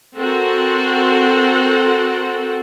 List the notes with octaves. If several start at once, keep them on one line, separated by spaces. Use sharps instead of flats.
C4 F#4 A4 A#4 F#5